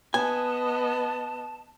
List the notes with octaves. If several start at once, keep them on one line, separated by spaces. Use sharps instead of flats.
B3 D#5 G#5 A5